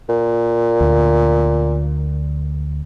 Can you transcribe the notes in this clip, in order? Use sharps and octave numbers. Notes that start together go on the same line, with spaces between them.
A#2
D2